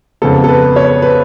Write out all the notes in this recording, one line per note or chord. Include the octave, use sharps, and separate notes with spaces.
F2 C#3 G#3 B3 A4
A4
B4
C#5
B4